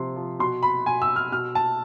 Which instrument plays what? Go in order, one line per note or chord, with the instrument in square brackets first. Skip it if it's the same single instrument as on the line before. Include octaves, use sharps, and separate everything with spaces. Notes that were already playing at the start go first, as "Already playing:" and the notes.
Already playing: [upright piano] C3 F3 C6
F3
B2 C6
B5
B2 G#5
E6
F6
B2 F6
A5